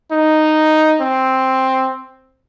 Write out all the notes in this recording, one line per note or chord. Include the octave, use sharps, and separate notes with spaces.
D#4
C4